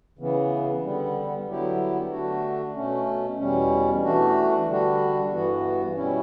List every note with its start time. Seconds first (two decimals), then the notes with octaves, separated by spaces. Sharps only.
0.19 C#3 E3 B3
0.83 D3 G3 B3
1.47 D3 F#3 B3 E4 G4
2.11 D3 A3 D4 F#4
2.74 B2 A3 C#4
3.38 E2 B2 G3 C#4
4.03 E3 A3 D4 F#4
4.67 D3 G3 D4 F#4
5.31 G2 E3 B3 F#4
5.95 B2 G3 C#4 E4